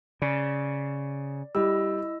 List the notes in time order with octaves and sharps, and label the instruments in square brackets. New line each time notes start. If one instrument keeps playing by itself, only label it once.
[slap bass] C#3 [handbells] D5
[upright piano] G3 [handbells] E4 D#5 E6